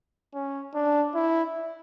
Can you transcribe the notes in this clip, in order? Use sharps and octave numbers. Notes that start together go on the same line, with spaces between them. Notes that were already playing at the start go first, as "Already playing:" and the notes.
C#4
D4
E4